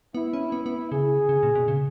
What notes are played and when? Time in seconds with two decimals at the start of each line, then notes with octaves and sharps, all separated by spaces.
0.14 B3 E4
0.33 C#4
0.52 B3
0.66 B3
0.91 C#3 G#4
1.29 C#3
1.43 A#2
1.55 B2
1.68 C#3